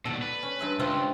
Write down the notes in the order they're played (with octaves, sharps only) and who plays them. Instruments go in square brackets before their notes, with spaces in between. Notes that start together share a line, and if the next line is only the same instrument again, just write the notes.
[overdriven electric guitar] D#2 B2 [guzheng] A4 D5 F#5
[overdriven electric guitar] B4
[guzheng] C#4
G2 E5 C6
[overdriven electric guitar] C#2 [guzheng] C4 F4 E5